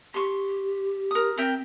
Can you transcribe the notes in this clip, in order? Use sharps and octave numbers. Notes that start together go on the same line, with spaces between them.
G4 C6 C#6
A#4 D#6
C4 A#4 E5 G5